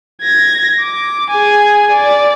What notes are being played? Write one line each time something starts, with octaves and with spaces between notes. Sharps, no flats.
G#6 A#6
D6
G#4 G#5
D5